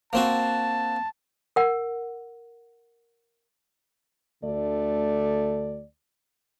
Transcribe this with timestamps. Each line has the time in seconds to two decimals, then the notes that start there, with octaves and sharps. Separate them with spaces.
0.13 A#3 C4 F#4 A5
1.56 A#4 F#5
4.44 D2 D3 A3 D5